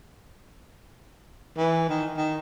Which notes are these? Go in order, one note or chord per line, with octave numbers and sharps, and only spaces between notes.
E3
D#3
D#3